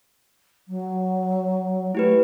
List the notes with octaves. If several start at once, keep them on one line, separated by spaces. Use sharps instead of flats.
F#3
A3 E4 G4 B4